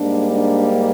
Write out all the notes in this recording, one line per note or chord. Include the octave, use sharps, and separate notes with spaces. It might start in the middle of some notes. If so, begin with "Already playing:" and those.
Already playing: G#2 G3 A#3 D4
D4